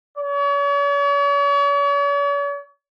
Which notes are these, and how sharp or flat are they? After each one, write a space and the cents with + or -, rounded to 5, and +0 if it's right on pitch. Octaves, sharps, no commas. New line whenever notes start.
C#5 +45